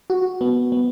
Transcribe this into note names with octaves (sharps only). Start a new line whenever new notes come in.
F#4
B3
B3